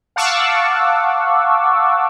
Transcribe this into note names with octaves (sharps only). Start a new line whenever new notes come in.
F5 F#5 A5 C#6 D6 E6